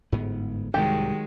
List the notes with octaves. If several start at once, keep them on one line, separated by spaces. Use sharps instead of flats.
G1 G#2 B3
C2 G#2 C3 D#3 F#3 G#3 G4